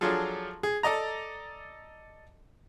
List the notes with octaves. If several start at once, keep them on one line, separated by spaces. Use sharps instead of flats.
F3 F#3 D4 F4 G#4 A4
G#4
A4 D5 D#5 A#5